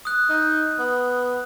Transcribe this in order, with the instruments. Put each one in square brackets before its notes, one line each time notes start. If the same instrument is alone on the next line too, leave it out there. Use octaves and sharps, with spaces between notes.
[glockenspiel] D#6 F#6
[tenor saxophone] D#4
B3